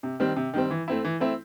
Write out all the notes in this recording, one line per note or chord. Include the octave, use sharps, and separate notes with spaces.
C3
D#3 G3 C4
C3
D#3 G3 C4
E3
A3 C4 E4
E3
A3 C4 E4